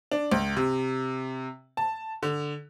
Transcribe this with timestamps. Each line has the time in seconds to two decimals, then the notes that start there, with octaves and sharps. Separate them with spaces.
0.11 D4
0.32 C#2
0.57 C3
1.77 A5
2.23 D3